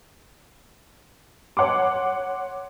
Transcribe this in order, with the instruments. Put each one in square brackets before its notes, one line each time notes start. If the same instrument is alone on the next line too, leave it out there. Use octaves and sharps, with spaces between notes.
[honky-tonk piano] C#5 F#5 C6 D6